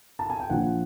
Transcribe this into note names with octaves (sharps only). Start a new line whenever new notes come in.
A5
G#5
G5
A#1 A#2 F3 F#5